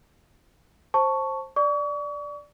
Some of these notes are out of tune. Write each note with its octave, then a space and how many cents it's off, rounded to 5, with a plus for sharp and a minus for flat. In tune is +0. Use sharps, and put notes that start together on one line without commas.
C5 +20 A5 +5 C#6 +5
D5 +0 C#6 +40